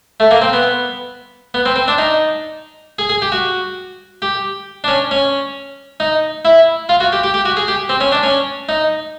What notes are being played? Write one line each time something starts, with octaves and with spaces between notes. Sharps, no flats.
A3
A#3
C4
B3
B3
C4
C4
D4
D#4
G#4
G#4
G4
F#4
G4
D4
C#4
C#4
D#4
E4
F4
F#4
G4
G4
G4
F#4
G#4
G4
C4
C#4
D4
C#4
D#4